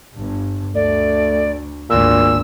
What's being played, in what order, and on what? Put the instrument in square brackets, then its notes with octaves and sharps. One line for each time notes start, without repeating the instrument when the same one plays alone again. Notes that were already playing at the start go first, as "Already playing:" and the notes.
[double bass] G1 G2
[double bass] D2 [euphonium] A3 [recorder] D5
[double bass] G#1 D2 [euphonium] A#2 [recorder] E6